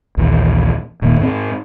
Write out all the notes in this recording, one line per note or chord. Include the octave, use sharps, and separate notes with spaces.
A#1 D#2 E3
D#1 A#2 D#3 A#3
G#2 C4